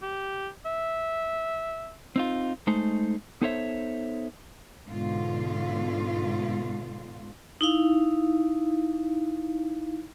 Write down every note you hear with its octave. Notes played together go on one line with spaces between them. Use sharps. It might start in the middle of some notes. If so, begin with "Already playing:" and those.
G4
E5
C4 D#4 F4
G#3 A3 D#4 C5
B3 D#4 A4 C5 C#5 E5
G#2 B2 D3 F4
D#4 E4 F5